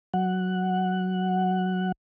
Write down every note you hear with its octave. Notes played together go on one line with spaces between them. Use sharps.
F#3 F#5